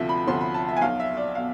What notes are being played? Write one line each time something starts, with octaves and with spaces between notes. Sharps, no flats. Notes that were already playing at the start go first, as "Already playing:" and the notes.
Already playing: D2 C3 F3 E5
B5
D2 C3 F3 C6
B5
A5
E5
G#5
B1 B2 F5
E5
D5
B2 F5